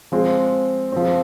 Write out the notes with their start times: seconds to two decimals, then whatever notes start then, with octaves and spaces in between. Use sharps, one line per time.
0.12 F3 G#3 C4
0.92 F3 C4